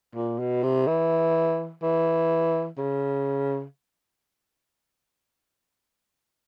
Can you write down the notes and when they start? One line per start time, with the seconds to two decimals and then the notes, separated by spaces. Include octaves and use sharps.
0.16 A#2
0.39 B2
0.63 C3
0.87 E3
1.82 E3
2.78 C#3